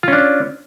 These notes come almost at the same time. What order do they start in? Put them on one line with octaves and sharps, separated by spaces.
F4 C#4 D4